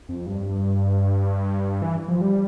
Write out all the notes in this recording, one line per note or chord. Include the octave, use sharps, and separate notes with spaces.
F2
G2
E3
F3
G3